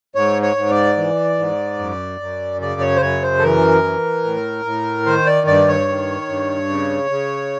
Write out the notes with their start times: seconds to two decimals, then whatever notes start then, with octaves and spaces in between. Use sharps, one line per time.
0.15 G#2 C#5
0.42 C#5
0.56 G#2
0.70 D5
0.97 E3
1.38 G#2
1.78 F#2
2.20 F#2
2.61 C#3 D5
2.81 C#5
2.96 C5
3.01 F#2 C#5
3.22 C5
3.39 A4
3.43 E3 A#4
3.84 E3
4.24 A2
4.65 A2
5.06 D#3 C5
5.26 D5
5.47 G2 D5
5.68 C#5
5.89 D#3
6.29 G2
6.69 C#3
7.10 C#3